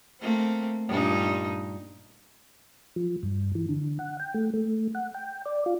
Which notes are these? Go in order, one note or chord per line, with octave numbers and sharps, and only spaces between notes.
A3 A#3 C4
G2 A#2 D#4
F3
G2
E3
D3
F#5
G5
A3
A3
F#5
G5
D5
F4